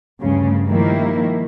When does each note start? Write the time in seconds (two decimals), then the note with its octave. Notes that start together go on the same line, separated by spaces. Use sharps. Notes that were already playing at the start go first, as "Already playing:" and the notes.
0.21 D2 G2 C#3
0.66 D#3 F3 G3 A#3 E4